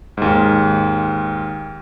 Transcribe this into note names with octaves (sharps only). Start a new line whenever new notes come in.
D#2 G#2